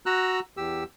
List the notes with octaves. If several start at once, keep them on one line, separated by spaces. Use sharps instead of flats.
F#4 A#5 E6 F#6
E2 G4 E6